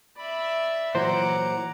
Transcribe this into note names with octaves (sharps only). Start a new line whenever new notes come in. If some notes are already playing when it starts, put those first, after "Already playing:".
D5 E5 B5
A#2 E3 F#3 C5 F#5 A#5 D6